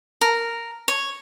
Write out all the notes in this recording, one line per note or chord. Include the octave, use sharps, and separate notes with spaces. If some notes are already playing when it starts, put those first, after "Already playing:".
A#4
C#5